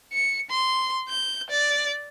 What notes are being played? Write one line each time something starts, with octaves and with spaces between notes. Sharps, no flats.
C#7
C6
G6
D5